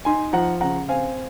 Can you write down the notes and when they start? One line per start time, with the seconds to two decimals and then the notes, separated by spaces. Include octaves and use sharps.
0.05 D#4 G#5 C6
0.33 F3 F#5 A#5
0.61 C#3 F#5 A#5
0.89 C4 F5 G#5